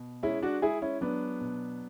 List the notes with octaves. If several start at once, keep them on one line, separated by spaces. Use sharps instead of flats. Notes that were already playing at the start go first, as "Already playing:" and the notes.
Already playing: B2
G#3 C#4 E4
D4 F#4
G#3 E4 G#4
C#4 E4
F#3 B3 D4
B2